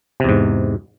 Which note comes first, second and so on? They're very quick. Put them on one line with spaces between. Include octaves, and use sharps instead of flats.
C3 E2 G#2